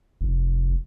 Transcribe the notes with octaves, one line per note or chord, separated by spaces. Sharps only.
F1